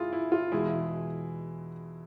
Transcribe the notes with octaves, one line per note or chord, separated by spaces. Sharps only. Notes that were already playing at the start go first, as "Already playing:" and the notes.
Already playing: G#3 E4 F4 G#4
E4
F4
E2 B2 G#3 E4 G#4